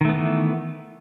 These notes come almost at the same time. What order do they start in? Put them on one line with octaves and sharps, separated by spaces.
D#3 A3 B3 E3